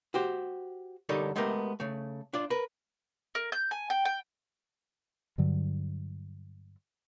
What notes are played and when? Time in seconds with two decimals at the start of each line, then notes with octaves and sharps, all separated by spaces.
0.14 F#4 G4 C5
1.09 D3 G3 D#4 A4 A#4 C#5
1.36 G#3 A3 B3 G4 A#4
1.80 C#3 A3
2.33 D4 F4 D5
2.50 A#4 B4
3.35 A#4
3.52 G6
3.71 G#5
3.90 G5
4.05 G5
5.38 G2 D3 F#3